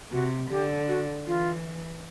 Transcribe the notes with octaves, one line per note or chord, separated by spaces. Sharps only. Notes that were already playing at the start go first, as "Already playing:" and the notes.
C3 F#4
D3 G4
F#4
E3 F4